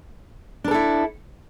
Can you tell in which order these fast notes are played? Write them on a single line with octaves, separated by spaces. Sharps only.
D4 A#4 A4 E4